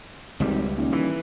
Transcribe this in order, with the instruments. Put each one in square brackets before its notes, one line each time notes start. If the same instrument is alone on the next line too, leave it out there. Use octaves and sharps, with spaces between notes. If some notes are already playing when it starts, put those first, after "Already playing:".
[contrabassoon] G#1 [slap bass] C#2 G3
[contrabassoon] D#1
[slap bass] E3